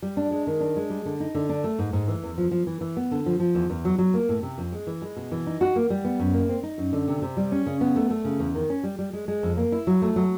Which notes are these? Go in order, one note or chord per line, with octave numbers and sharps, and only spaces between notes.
G3
D4
G#3
D#3
D4
G#3
G3
D3
D#4
D3
D4
A3
G#2
G#2
E3
E2
F3
F3
E3
E3
B3
D3
F3
F3
E2
E2
F#3
F#3
A#3
A2
C3
F2
G#3
E3
G#3
B2
E3
D#4
F#4
A#3
G3
B3
F#2
A#3
C4
D#4
F#2
D3
C3
C3
G3
C#4
C#3
B3
A3
A3
C#3
E2
D#3
C#4
G3
G3
G#3
G#3
F2
A#3
E4
F#3
A3
F#3